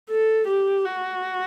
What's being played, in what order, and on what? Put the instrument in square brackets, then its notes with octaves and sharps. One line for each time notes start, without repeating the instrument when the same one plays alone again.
[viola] A4
G4
F#4